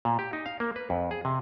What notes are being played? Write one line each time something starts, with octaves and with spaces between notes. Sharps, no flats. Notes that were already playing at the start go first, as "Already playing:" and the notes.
A#2
G4
D#4
F5
A#3
B4
F2
G#4
C3